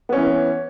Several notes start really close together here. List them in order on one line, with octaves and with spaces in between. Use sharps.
B3 C#4 E3